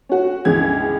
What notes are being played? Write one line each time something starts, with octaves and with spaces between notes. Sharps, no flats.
C#4 F#4
G1 C#2 E3 G#4 G#6